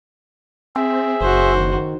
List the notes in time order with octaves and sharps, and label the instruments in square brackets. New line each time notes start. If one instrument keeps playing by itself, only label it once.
[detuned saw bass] C4 [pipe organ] G#4 E5
[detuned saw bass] F#1 [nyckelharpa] F#4 C5
[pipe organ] D#3